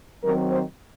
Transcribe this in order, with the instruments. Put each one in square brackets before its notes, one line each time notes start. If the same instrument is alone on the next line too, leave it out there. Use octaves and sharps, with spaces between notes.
[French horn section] D#3 F#3 C4 A#4
C5